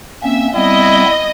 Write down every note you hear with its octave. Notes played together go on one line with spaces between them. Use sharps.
A#3 C4 C#4 E5
G3 B3 C4 E4 D#5